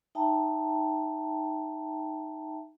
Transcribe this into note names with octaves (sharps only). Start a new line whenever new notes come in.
D#4 E5 G5 A5 A#5